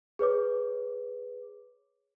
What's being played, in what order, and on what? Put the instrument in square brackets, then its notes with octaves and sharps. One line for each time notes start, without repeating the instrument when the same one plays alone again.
[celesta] G#4 B4 C#5 D6